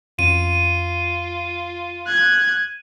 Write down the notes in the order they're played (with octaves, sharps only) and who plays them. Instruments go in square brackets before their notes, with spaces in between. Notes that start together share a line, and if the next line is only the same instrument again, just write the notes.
[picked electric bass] F2 C#4 [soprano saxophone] F4 [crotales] D#7
[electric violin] F#6 G#6